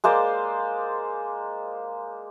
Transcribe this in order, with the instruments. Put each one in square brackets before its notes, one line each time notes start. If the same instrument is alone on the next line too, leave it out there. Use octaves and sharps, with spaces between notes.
[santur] G#3 A#3 C5 D5